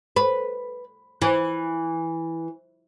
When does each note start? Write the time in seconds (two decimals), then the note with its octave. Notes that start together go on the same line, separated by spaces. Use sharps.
0.16 B4
1.22 E3